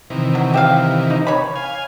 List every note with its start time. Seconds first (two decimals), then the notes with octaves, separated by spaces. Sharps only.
0.10 C3 D#3 E3
0.35 F#3
0.54 G4 E5 F5
1.10 D#4
1.27 C#5 B5
1.55 F5 G#5